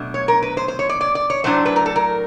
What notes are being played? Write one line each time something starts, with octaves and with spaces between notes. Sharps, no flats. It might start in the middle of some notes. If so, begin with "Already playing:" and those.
Already playing: B2 F#3 A3 D4
C#5
A#4
B4
C5
C5
C#5
D5
D5
D5
C#5
A2 F#3 A3 D4 C5
B4
A#4
A4
A#4